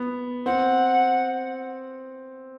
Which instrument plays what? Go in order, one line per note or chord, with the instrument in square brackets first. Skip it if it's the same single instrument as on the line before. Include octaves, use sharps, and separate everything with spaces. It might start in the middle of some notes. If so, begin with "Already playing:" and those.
Already playing: [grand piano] B3
[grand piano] C4 [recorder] F#5